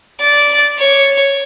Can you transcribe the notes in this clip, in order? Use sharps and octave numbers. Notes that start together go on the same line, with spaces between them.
D5
C#5